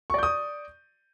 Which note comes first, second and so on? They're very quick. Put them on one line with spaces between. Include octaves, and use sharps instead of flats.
C#6 D5 G6 D#6